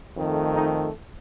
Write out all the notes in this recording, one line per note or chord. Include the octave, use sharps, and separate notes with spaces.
F2 D#3 A3
D#4